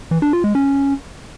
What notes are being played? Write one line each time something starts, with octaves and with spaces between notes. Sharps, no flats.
E3
D4
F4
G#3
C#4